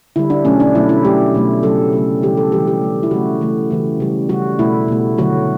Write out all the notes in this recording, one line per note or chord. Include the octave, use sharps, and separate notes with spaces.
D3 G3 E4
D4
B2 F#3 A3 C#4
D4
B2 F#3 A3 E4
E4
B2 F#3 A3 G4
B2 F#3 A3
C#3 F#3 A3 A4
C#3 F#3 A3
C#3 E3 G3 G4
A4
C#3 E3 G3 G4
G4
C#3 F#3 A3
E4
C#3 F#3 A3 F#4
C#3 E3 A3
C#3 E3 A3
C#3 G3
C#3 G3 F#4
B2 A3 E4
B2 A3
D3 F#3 A3 F#4